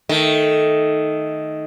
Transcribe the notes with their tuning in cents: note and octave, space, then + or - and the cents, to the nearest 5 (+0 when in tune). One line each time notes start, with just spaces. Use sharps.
D#3 +0 A3 +0